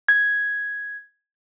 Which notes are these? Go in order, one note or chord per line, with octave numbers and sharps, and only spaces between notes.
G#6